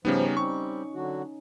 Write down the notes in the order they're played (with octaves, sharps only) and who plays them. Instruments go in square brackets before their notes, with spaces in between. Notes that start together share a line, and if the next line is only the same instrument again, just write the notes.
[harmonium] G#2 F3 [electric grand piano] C#3 G3 B3 [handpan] C#4 D#4
[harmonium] G3 C4 [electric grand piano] C#6
[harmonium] D3 F#3 F#4